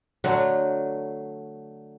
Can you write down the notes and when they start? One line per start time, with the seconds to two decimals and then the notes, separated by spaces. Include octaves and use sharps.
0.24 D3 F#3 A3 D4